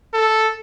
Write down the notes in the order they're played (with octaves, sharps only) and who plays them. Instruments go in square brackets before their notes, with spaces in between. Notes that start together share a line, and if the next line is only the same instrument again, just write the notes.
[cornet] A4